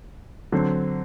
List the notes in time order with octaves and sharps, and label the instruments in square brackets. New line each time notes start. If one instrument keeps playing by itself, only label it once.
[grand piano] D3 F#3 C4